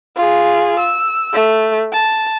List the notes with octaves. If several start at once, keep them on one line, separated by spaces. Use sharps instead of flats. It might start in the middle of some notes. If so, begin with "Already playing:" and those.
F4 G#4
E6
A3
A5